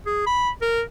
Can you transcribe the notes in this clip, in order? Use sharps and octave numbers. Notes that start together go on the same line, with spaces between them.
G#4
B5
A#4